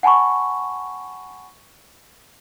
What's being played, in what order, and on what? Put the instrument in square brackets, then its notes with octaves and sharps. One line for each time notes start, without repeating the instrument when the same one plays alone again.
[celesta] F#5 G#5 A5 B5 C#6